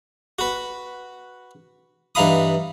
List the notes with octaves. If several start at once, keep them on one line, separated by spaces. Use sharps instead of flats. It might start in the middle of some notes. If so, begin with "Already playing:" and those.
F#4 B4
G2 E3 D#4 F5 B5 D#6